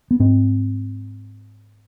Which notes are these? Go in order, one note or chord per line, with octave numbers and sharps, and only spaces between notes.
B3
G#2 C4